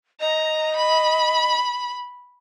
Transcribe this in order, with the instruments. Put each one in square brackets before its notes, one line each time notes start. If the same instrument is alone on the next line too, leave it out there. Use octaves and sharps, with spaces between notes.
[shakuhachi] D#5 [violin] A#5
[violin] B5